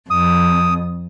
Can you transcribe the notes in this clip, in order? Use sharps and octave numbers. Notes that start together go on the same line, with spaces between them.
F2 D#6